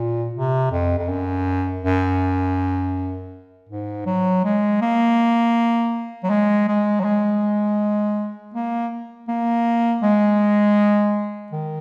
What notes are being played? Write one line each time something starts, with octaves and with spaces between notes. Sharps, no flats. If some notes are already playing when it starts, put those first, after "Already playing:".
Already playing: A#2
C3
F2
F2
F#2
F#2
G#2
F#3
G#3
A#3
F#3
G#3
G#3
F#3
G#3
A#3
A#3
G#3
D#3